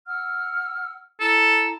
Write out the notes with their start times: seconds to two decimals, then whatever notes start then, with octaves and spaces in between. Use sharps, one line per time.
0.07 F#5 E6 F6
1.20 E4 A4 A#5